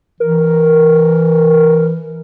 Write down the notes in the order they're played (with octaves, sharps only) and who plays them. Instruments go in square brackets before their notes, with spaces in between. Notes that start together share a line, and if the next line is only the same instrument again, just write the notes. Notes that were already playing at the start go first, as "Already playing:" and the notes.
[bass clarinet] E3 [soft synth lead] A#4